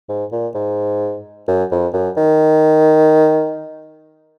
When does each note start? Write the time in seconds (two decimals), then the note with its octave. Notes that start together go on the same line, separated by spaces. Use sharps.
0.09 G#2
0.32 A#2
0.55 G#2
1.48 F#2
1.71 F2
1.93 F#2
2.17 D#3